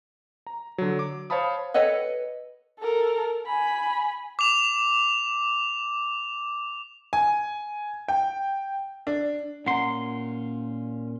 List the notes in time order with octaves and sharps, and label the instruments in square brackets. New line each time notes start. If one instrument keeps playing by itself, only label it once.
[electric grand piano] A#5
D3 F#3
D6
C5 C#5 F5 A5 B5 D#6
[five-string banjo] A4 B4 C#5 D#5 F#5
[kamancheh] A4 A#4
G#5 B5
[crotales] D6 F7
[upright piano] G#5
G5
D4
[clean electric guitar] A#2 C6 [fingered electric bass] C#4 [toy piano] F#5 A#5